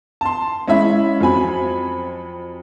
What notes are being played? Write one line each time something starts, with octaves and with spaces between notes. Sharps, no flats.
A5 C6
G#3 C#4 E4 E5 B5
F2 F#3 G#5 B5